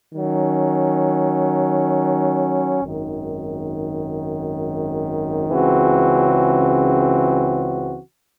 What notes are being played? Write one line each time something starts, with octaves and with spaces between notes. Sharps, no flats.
D#3 F#3 C#4
G#1 F#2 D#3
C#2 C#3 E3 C4 F#4